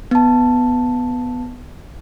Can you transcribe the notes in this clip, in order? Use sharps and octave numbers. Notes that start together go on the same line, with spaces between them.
B3 A5